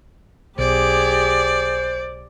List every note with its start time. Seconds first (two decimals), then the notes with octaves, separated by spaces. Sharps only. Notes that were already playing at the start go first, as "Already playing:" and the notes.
0.58 B1 G4 G#4 C5 D5